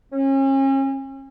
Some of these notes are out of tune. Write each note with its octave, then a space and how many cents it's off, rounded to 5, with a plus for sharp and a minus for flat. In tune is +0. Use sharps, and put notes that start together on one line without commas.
C#4 -35